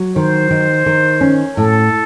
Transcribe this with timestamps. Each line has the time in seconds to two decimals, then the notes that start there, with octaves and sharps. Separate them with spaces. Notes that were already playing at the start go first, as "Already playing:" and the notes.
Already playing: F#3
0.16 D#3 C5
0.51 D#3
0.86 D#3
1.21 C#4
1.56 A2 A4